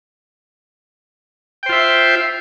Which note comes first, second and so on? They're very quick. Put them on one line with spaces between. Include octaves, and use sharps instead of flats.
G5 C5 F4 E5